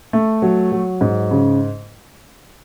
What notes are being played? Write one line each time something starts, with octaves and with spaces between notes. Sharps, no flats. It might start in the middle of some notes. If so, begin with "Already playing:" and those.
A3
F#3
F#3
G#2
C#3